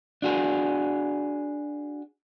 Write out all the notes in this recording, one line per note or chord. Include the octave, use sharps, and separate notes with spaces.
D4 F#4 G#4